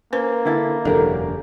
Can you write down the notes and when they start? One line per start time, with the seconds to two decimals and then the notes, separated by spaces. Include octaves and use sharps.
0.13 A#3 C#4 B4 C5
0.45 D3 E4 A4
0.85 E1 F#2 C#3 D4 G4 A4 A#4